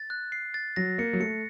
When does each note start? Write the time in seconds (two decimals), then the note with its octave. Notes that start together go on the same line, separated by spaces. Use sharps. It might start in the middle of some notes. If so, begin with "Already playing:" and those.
Already playing: A6
0.10 F#6
0.32 C7
0.54 A6
0.76 F#3 A#6
0.98 A#3 C#7
1.13 F#3
1.20 A3 C#7